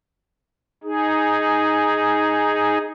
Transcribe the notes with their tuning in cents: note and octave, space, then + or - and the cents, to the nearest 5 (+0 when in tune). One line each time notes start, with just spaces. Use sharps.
D#4 +0 G#4 +0